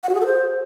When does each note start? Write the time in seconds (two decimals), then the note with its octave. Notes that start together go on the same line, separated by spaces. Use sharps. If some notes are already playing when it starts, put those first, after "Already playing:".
0.03 F#5
0.09 F#4
0.15 G#4
0.20 A4
0.26 C5